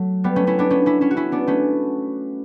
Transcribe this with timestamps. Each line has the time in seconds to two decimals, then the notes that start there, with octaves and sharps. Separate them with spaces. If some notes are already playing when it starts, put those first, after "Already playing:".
Already playing: F#3 A3
0.24 G3 B3
0.36 A3 C#4
0.47 C#4 E4
0.59 B3 D4
0.70 A3 C#4
0.86 C#4 E4
1.01 C#4 E4
1.11 F#4
1.17 C#4 E4
1.32 B3 D4
1.47 A3 C#4